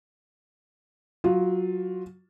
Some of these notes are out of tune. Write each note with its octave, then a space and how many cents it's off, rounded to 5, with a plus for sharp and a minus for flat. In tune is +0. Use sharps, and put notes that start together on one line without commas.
F#3 +0 F4 +10